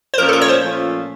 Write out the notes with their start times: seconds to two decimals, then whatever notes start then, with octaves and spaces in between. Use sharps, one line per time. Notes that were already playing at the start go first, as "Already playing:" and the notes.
0.14 C5
0.18 A#2 F3 A3 C#4 F4 A#4
0.28 A4
0.33 A#4
0.42 C#5
0.48 C5
0.63 A#2 F3 A3 C#4 F4